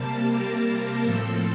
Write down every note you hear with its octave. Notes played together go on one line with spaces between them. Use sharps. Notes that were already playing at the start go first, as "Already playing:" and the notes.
Already playing: C3 G3 A#3 A5
A#4
A2 F3 C4 A4